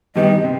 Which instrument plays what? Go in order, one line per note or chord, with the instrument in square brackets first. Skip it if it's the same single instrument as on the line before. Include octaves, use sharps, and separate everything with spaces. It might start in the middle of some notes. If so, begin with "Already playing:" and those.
[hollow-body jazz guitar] G2 D#3 G3 B3 [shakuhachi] D#5
[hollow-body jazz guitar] C3